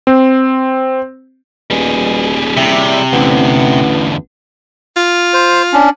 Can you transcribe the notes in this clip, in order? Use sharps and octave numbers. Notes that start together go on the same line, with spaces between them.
C4
D#1 B2 G3 G#4
C3 E4
A1 E2 D3 B3
F4
C5
C#4 D4